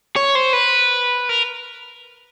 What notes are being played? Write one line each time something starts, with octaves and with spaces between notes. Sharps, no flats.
C#5
C5
B4
A#4